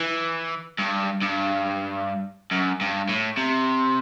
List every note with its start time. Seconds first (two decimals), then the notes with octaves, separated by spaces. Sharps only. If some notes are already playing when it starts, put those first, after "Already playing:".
Already playing: E3
0.79 G2
1.22 G2
2.52 F#2
2.81 G2
3.09 A2
3.38 C3